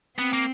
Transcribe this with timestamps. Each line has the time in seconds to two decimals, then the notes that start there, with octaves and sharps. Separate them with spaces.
0.18 B3 C4
0.33 A#3